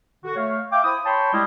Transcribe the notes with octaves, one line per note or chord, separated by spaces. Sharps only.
D3 F#4
A3 C#5 F5
E5 F5 G5 D6
E4 C5 D#6
C#5 G5 A5 B5 C6
G3 G#3 E4 G4 D#5